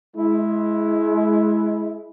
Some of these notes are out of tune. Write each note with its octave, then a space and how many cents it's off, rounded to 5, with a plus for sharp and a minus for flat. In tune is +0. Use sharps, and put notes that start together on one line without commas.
G#3 +25 E4 +0